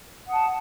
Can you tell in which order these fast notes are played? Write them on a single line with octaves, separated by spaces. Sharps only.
F#5 D#6 A5